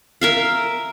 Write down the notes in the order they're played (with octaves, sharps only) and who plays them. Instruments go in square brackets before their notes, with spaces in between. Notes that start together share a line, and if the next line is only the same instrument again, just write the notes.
[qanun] A#4 E5 F5